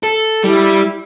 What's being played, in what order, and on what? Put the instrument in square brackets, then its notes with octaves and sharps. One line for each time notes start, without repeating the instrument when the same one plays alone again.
[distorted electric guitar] A4
[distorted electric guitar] G3 [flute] E4